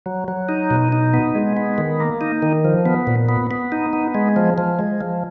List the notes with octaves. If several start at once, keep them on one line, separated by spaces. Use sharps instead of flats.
F#3
F#3
D#4
B2
D#4
B3
G#3
B3
D#3
A#3
D#4
D#3
F3
B3
A#2
B3
B3
D#4
B3
G#3
F3
F3
G#3
F3